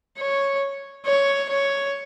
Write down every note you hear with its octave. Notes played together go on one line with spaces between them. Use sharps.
C#5
C#5
C#5